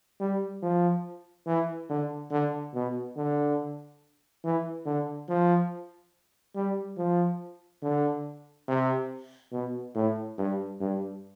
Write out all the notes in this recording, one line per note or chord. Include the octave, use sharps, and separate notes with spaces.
G3
F3
E3
D3
D3
B2
D3
E3
D3
F3
G3
F3
D3
C3
B2
A2
G2
G2